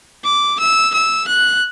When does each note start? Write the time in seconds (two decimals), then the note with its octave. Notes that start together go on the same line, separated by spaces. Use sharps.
0.25 D6
0.59 E6
0.94 E6
1.28 F#6